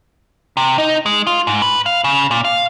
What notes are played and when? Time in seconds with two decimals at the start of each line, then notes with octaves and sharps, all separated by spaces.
0.57 C3
0.78 D#4
1.06 G#3
1.27 F4
1.47 G#2
1.62 B4
1.86 F5
2.04 C#3
2.31 A#2
2.45 F5